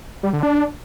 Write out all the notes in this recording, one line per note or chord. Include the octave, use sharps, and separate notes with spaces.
G3
D3
D4